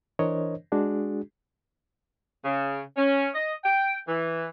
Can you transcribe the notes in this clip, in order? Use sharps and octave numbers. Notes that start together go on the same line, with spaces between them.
E3 D4 A#4 C5 C#5 D#5
G#3 D4 F#4 G#4
C#3
C#4
D#5
G5
E3